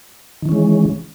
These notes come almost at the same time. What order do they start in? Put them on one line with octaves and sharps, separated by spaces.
D#3 E3 C#4 G#3